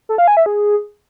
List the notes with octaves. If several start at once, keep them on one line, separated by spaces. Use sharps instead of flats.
A4
F5
G#5
E5
G#4